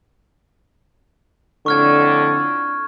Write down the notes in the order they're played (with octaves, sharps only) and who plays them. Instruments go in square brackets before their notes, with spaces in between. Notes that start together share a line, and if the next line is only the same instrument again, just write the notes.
[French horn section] F2 A2 D3 [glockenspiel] C#6 F6 G#6